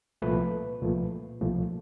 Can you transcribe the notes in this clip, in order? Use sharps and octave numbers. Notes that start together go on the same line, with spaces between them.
C2 A#2 F3 A3 B4
C2 A#2 F3 A3
C2 A#2 F3 A3